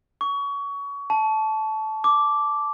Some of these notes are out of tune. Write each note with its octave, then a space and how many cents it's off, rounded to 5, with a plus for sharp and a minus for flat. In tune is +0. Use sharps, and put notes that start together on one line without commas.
C#6 +25
A5 -15
D6 -5